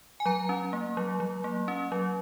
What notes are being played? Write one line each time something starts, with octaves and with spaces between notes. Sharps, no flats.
G#5
F#3 A#5
C#4
A#3
F#3
F#3
A#3
C#4
F#3